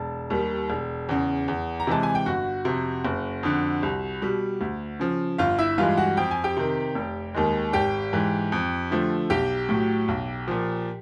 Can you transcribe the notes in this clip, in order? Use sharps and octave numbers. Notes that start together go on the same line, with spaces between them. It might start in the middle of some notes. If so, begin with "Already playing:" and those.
Already playing: E1 A5
D#2 D#3 G3
E1
E2 C#3
E2
A#5
C3 E3 G#3 A5
G#5
G5
G1 F#4 F#5
F2 C3
F#1
F2 D3
C2
B2 G3
D2
C#3 F3
G1 F4 F5
E4 E5
G2 E3 G#3 F4 F5
F#4 F#5
F2 G5
G#5
G4 G5
C3 D#3
F1
D#2 D#3 G#3
G#1 G4 G5
G#2 E3
F2
D3 F3 A3
B1 G4 G5
A2 F#3
B1
A#2 F3